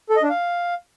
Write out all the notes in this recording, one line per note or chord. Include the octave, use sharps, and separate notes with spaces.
A4
D#5
D4
F5